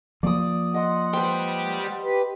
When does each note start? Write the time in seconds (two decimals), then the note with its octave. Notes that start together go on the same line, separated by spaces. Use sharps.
0.23 F3 A#3 D5 D#6
0.74 D#5 F#5 C6
1.13 G3 B4 C5 G5
2.03 G4 B4